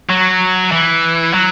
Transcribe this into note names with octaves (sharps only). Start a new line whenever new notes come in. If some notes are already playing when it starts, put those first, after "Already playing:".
F#3
E3
F#3